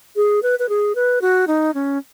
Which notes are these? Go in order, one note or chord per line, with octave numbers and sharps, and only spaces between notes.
G#4
B4
B4
G#4
B4
F#4
D#4
C#4